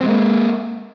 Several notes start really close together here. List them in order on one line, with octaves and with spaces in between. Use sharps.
C4 G3 G#3 A#3